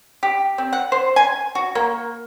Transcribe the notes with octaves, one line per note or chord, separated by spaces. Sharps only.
G4
C4
F#5
C5
G#5
F#4
A#3